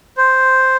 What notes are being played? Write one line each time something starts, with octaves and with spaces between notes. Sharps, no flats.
C5